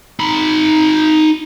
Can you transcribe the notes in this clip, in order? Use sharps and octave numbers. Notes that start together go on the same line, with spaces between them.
D#4 B5